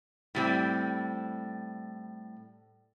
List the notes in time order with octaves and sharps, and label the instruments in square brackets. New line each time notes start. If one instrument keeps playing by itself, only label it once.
[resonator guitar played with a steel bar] A2 G3 C4